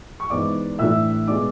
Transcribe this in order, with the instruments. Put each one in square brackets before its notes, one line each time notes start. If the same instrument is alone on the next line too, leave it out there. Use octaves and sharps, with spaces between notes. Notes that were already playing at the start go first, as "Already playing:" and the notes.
[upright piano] C#6
G#2 E3 B3 D5 D6
A2 E3 A3 D4 E5 E6
B2 G#3 B3 D4 D5 D6